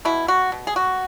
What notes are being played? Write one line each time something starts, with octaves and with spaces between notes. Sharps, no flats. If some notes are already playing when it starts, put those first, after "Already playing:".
B2 E4
F#4
B2
G#4
F#4